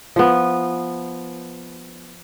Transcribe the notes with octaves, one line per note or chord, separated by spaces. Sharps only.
F3 B3